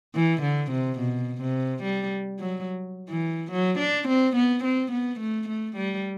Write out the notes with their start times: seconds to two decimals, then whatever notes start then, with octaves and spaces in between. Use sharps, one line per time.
0.15 E3
0.42 D3
0.71 C3
0.99 B2
1.41 C3
1.83 G3
2.40 F#3
3.10 E3
3.52 F#3
3.79 D4
4.08 C4
4.36 B3
4.64 C4
4.91 B3
5.20 A3
5.48 A3
5.76 G3